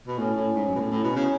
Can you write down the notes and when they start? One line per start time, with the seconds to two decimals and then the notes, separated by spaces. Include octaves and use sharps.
0.07 B2
0.18 A2 C#4
0.36 A2
0.55 G#2
0.67 F#2
0.75 B2
0.79 A2
0.91 A2 E4
1.01 B2 D#4
1.10 C#4
1.16 C#3
1.20 D#4